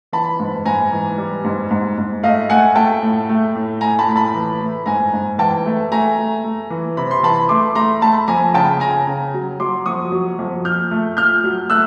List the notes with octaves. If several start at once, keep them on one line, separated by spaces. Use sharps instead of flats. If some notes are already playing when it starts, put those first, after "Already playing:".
E3 A5 B5
G#2
G#2 G#5 A#5
E3
G3
G#2
G#2
G#2
A3 D#5 F5
A3 F#5 G#5
A3 G5 A5
A2
A3
A2
A2 G#5 A#5
A5 B5
A2
A5 B5
E3
A3
G#2 G#5 A#5
G#2
E3 G5 A5
A3
A3 G#5 A#5
A3
A3
E3
C3 B5
C6
E3 A5 B5
A3 C6 D6
A3 A#5 C6
A3 A5 B5
F2 G#5 A#5
C#3 G5 A5
C#3 G#5 A#5
C#3
F#3
F#3 C6 D6
F2 C#6 D#6
F#3
F2
A#2 F6 G6
A3
A#2 F6 G6
F#3
A3 E6 F#6